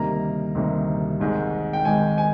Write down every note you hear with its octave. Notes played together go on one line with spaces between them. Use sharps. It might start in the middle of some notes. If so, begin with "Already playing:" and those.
Already playing: D2 C3 D#3 G3 A#3 A#5
D2 C3 D#3 G3 A#3
G#1 G#2 D#3 G#3
G5
G#1 G#2 D#3 G#3 G#5
G#5